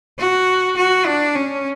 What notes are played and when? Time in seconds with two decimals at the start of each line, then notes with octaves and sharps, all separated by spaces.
0.18 F#4
0.76 F#4
1.06 D4
1.35 C#4